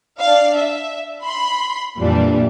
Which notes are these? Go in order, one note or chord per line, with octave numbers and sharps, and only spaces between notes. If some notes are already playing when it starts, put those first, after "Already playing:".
D4 F5
E5
B5 C6
F2 A#2 E3 G3 D4